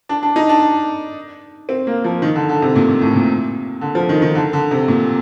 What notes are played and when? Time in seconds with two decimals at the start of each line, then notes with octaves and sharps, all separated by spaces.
0.09 D4
0.23 D4
0.36 D#4
0.49 D4
1.69 C4
1.87 A#3
2.04 F3
2.22 D#3
2.36 D3
2.49 D3
2.62 C3
2.76 A#2
2.88 A#2
3.01 A2
3.15 A#2
3.81 D3
3.95 F3
4.09 D#3
4.22 D#3
4.35 D3
4.53 D3
4.71 C3
4.88 A#2